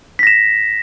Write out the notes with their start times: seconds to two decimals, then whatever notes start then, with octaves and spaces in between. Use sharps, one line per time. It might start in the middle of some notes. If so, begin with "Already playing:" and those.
0.19 B6
0.23 A#6
0.27 E7